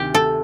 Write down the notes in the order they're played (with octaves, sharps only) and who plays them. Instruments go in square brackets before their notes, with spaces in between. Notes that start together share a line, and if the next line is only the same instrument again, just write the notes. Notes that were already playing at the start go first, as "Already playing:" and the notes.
Already playing: [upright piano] D2 C3 D#3 [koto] G4
[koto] A4